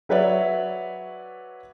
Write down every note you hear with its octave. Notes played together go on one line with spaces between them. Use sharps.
F#3 B4 C#5 D5 E5